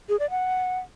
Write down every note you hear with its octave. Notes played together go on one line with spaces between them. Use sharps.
G#4
D5
F#5